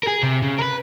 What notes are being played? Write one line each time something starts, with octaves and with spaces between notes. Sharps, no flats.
G#4 A#4
C3
C#3
A#4 B4